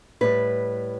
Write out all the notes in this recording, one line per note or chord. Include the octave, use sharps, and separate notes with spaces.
A2 G3 B4